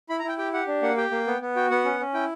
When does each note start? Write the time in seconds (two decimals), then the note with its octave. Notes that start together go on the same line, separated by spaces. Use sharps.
0.09 E4 B5
0.20 A#5
0.24 E4 G5
0.38 G4 G5
0.53 G4 F#5
0.67 D4
0.82 A#3 F#5
0.97 G4 G5
1.11 A#3
1.27 B3
1.41 B3
1.56 F#4 G5
1.70 B3 F#5
1.85 C#4
2.00 C#4
2.14 E4 G5